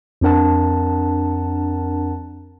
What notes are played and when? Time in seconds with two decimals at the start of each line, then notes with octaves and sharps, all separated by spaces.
0.21 F2 C4 D4 A#4 F#5 A5